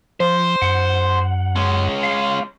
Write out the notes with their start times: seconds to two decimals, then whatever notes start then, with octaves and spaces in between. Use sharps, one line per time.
0.20 F3 C5
0.62 F#2 F#5
1.56 G#3 C#4
2.03 F5